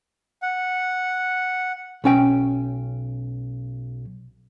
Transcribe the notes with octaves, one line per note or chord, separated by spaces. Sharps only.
F#5
B1 C#4 G5